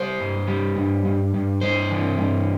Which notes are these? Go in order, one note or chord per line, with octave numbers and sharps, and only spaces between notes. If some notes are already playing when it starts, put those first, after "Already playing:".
Already playing: G3 C5
G2
G3
G2
G2
G2
G2 C5
E3
G2